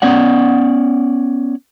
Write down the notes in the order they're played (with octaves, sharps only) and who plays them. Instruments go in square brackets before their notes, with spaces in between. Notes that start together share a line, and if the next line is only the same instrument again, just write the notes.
[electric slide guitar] B3 C#4 D5 F#5